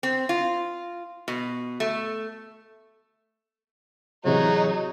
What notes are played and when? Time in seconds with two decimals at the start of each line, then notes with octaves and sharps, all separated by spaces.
0.03 C4
0.29 F4
1.28 B2
1.80 A3
4.25 A2 C3 E3 F#3 D#4 G#4